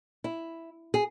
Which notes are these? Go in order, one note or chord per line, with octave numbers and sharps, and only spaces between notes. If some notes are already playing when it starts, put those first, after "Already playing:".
E4
G#4